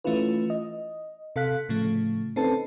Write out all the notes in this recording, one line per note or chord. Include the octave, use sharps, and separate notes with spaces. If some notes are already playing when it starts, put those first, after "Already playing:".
E3 A3 C#4 E4 F4 B4
D#5
C3 A4 F5 F#6 B6
A2 C#3 F3 A3
C4 C#4 D#4 A4 B4 A5